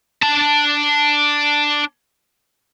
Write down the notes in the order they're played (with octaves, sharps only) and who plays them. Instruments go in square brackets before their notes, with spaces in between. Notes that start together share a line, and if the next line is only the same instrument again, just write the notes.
[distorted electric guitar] D4 A5